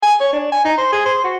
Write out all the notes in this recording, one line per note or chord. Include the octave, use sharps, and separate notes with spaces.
G#5
C#5
D4
G#5
D#4
C5
G#4
C5
F#4